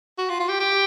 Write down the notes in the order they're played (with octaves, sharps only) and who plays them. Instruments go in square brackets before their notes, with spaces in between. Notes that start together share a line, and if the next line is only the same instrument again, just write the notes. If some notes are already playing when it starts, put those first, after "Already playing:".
[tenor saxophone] F#4
F4
F4
G4
G4